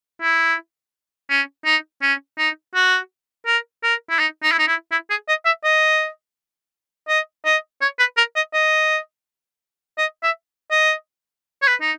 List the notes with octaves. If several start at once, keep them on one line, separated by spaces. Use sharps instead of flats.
E4
C#4
D#4
C#4
D#4
F#4
A#4
A#4
E4
D#4
D#4
E4
D#4
E4
E4
G#4
D#5
E5
D#5
D#5
D#5
C#5
B4
A#4
D#5
D#5
D#5
E5
D#5
C#5
B4
D#4